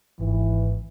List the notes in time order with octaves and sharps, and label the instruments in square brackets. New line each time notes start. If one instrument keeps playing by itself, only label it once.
[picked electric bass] G#1 [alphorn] E3